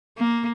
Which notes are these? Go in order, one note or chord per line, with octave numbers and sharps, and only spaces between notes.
A#3